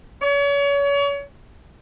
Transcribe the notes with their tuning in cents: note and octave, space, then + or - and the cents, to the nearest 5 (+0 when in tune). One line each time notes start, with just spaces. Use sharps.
C#5 +35